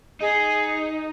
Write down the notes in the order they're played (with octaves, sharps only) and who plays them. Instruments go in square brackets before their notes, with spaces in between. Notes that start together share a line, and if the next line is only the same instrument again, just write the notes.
[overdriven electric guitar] D#4 [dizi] G#4